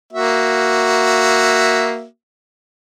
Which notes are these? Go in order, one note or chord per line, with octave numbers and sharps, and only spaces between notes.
A#3 F#4 E5